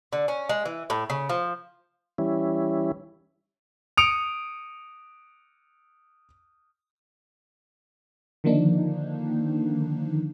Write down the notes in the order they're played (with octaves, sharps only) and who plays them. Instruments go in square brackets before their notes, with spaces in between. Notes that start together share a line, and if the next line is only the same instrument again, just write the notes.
[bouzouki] D3
C#4
G#3
E3
A2
C#3
F3
[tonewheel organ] E3 G3 C#4 E4
[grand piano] D#6 C#7 D7 F7
[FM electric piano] D3 D#3 F3 A#3 D4 D#4